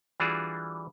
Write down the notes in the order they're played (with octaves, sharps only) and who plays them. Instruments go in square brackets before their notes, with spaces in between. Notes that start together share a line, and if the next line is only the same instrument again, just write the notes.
[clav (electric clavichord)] E3 G3 D4 F4 F#4 G#4